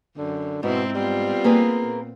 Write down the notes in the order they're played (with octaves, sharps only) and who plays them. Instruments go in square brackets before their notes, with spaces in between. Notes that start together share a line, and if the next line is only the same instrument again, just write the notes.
[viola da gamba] F#2 [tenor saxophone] D3
[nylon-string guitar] G#2 [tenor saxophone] B2 [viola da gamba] C4 E4
[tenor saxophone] G3 [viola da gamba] B3 C4 F4
[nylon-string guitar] A#3 G#4 B4
[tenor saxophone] A#2